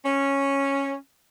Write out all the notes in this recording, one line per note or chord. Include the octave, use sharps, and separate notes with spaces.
C#4